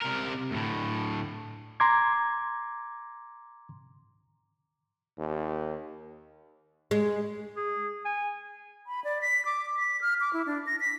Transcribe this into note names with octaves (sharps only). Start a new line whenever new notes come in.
C3 A#4
D2 A2
A#5 C6 D6 G#6
D#2
G#3
G#4
G#5
B5
D5
B6
D6
B6
F6
D6
E4
D4
A#6
B6